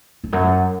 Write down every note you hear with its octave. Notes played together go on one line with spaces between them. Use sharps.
F2
F#2